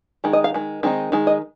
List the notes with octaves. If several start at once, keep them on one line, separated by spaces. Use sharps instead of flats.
D#3 G#3
D#5
F5
D#3 G#3
D#3 G#3 C4 D#4
D#3 G#3
D#5